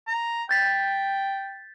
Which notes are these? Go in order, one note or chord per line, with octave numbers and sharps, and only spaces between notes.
A#5
G5 G6 A6 B6